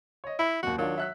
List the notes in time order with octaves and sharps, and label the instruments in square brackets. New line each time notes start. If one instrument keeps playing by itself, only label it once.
[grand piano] C#5 D#5
[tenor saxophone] E4 [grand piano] B5
[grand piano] F#1 D#2 [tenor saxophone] F#4
[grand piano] D#3 D4 F4 [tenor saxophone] F#3
[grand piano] E5 F#6 B6